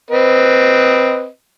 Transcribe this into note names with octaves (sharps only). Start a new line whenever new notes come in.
C4 B4 D#5